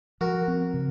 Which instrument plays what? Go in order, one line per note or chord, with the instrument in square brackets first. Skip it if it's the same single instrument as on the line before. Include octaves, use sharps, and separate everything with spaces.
[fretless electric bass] F3 [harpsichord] F#4 A#4
[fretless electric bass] C4
C#3